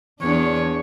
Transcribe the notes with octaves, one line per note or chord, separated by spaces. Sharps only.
E2 D4 C#5